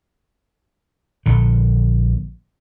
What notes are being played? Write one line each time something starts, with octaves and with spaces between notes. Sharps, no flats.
A#1 D3